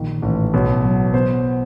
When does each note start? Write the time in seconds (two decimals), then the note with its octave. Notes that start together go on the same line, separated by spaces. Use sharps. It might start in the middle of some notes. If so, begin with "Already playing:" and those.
Already playing: A#1 D#3
0.22 A1
0.54 B1
0.84 F#3
1.13 B2 C5